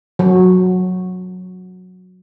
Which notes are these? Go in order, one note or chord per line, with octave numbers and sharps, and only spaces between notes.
F#3